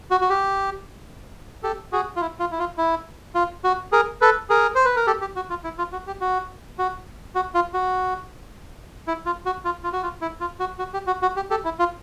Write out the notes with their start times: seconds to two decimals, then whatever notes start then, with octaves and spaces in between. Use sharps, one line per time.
0.11 F#4
0.21 F#4
0.30 G4
1.63 G4 A4
1.92 F#4 G#4
2.16 F4
2.21 E4
2.40 F4
2.51 E4
2.59 F4
2.78 E4
3.35 F4
3.64 F#4
3.92 G#4 A#4
4.21 A4 B4
4.50 G#4 A#4
4.75 C5
4.85 B4
4.96 A#4
5.07 G4 A4
5.21 G4
5.36 F#4
5.50 F4
5.64 E4
5.78 F4
5.92 F#4
6.07 G4
6.21 F#4
6.79 F#4
7.35 F#4
7.55 F4
7.74 F#4
9.07 E4
9.26 F4
9.46 F#4
9.65 F4
9.83 F4
9.93 F#4
10.03 F4
10.21 E4
10.40 F4
10.59 F#4
10.79 F#4
10.94 G4
11.07 F#4
11.22 F#4
11.36 G4
11.50 G4 A4
11.65 E4
11.79 F4